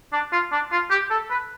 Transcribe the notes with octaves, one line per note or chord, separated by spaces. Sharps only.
D4
F4
D4
F4
G4
A4
B4